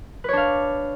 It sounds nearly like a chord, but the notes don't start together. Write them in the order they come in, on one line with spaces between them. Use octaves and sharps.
B4 C#5 D4 F5